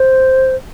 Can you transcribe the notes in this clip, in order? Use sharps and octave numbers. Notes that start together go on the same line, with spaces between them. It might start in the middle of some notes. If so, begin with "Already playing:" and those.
Already playing: C5